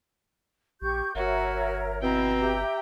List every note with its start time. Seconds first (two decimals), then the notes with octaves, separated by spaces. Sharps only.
0.82 A#1 G4 C#6 G6
1.15 G1 F#4 A#4 C#5 E5
2.02 B2 C4 E4 G5 A#5
2.40 G4 E5